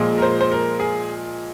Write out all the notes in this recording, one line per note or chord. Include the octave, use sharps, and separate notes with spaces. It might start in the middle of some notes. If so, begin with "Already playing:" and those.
Already playing: A#2 F3 G#3
A#4
C5
C5
A#4
G#4